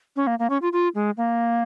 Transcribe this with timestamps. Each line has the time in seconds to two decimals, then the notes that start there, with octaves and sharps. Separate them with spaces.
0.16 C#4
0.27 A#3
0.39 A#3
0.50 C#4
0.62 F4
0.73 F4
0.95 G#3
1.17 A#3